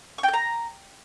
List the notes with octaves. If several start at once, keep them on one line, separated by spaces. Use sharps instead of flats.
C#6
G5
G6
A#5